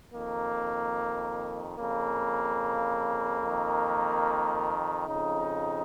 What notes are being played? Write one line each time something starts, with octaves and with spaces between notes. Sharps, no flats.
F2 D#3 A#3
F2 C#3 A#3
F2
D#3
F2 C#3 D#4